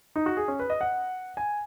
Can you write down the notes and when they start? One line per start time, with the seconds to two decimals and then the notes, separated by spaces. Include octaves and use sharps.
0.16 D#4
0.26 F#4
0.37 G#4
0.48 C#4
0.59 B4
0.70 D#5
0.81 F#5
1.37 G#5